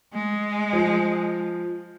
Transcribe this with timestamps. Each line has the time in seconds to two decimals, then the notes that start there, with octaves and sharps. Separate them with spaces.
0.14 G#3
0.73 F3